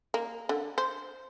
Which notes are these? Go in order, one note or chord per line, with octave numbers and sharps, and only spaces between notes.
A#3
D3
C5